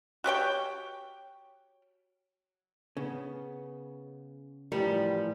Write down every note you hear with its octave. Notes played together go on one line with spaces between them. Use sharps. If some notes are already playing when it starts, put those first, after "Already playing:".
F#4 G4 C#5 G5
C#3 B3
A2 E3 F3 G3 A#4